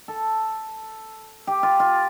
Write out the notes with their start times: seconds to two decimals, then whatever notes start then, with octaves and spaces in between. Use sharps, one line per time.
0.08 A4
1.47 G4
1.63 F4
1.80 F4